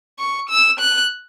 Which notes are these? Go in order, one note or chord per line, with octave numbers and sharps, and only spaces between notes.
C#6
E6
F#6